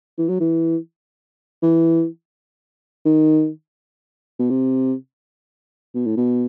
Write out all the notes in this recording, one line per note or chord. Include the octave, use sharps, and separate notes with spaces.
E3
F#3
E3
E3
D#3
B2
C3
B2
A2
B2